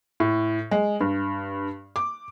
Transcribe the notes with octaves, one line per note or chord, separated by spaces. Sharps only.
A2
G#3
G2
D6